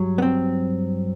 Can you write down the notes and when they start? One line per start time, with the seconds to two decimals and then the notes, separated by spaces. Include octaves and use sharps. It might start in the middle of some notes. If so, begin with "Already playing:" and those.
Already playing: G2 F#3
0.18 B3
0.22 C4